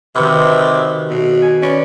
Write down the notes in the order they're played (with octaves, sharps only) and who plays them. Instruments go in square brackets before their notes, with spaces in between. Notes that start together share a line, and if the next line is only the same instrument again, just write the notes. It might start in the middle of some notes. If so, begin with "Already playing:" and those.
[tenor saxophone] C3 [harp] D#3 F#4 B4
[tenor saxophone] B2
[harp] G#5
[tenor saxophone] C#4 [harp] B4 D5